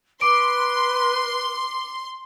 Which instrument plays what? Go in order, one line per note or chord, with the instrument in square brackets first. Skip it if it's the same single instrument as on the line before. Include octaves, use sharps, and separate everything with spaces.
[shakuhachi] B4 [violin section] C6 [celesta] D6 D7